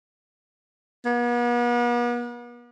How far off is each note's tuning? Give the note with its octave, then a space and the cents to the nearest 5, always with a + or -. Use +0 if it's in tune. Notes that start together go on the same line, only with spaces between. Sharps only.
B3 -45